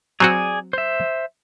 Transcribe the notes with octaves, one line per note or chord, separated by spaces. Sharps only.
F#3 C4 F#4 G#4 D5 G#5
C5 E5